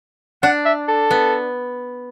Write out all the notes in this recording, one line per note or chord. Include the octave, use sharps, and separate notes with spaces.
D4 F#5
E5
A4
B3